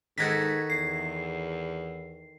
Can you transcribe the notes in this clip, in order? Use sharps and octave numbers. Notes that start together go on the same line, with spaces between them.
G#2 D#3 F#4 A4 G#6 A#6 B6
E2 C7